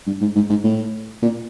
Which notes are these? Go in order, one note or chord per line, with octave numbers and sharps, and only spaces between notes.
G2
G#2
G#2
G#2
A2
A#2